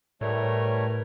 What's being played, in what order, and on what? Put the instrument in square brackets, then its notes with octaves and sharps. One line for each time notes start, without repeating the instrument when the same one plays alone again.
[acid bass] A2 [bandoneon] G3 A3 C#5 [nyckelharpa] A#4 B4